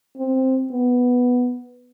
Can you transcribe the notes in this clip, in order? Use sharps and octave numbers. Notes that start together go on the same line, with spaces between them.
C4
B3